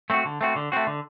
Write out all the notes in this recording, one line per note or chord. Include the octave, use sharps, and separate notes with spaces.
A3 C4 F#4
D3
A3 C4 F#4
D3
A3 C4 F#4
D3